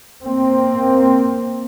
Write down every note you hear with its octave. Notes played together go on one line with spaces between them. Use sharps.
A#3 C4